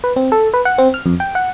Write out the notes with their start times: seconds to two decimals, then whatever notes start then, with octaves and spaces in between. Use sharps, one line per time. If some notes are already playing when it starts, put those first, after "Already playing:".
0.04 B4
0.16 C4
0.32 A4
0.54 B4
0.65 F#5
0.78 C4
0.94 F6
1.06 F2
1.20 G5
1.35 F#5